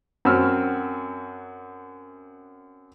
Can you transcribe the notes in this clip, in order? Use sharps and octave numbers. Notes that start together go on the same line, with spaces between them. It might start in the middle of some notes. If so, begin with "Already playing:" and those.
F#2 C4 F#4 E6 F6